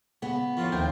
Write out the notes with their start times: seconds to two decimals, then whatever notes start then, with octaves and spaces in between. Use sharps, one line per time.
0.22 C#3 B3
0.57 A2 D#3 F3 F#3 F4
0.72 D#2 C4 A#4 G5